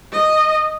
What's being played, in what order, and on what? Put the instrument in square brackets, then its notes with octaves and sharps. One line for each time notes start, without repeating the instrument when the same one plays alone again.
[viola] D#5